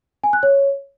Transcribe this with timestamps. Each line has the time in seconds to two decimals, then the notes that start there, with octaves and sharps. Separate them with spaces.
0.23 G#5
0.33 F#6
0.43 C#5